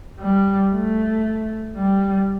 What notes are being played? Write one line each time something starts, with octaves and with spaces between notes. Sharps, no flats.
G3
A3
G3